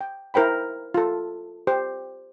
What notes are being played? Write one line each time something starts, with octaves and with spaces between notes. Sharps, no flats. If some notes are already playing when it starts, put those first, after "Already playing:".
G5
E4 A#4 C5 G5 B5
F4 A4
G4 C5